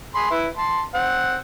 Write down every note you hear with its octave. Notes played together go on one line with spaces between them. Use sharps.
G#4 B5 C6
E4 B4
A5 C6
C4 F#5